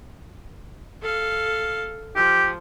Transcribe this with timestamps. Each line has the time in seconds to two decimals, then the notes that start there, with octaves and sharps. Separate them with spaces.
1.02 A4 F5
2.16 F3 G4